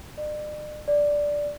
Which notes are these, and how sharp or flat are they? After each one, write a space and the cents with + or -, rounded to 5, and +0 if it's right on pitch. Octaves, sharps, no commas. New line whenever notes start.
D5 +45
D5 -5